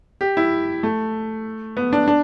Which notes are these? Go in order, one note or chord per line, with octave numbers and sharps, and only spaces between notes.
G4
E4
A3
B3
D4
D4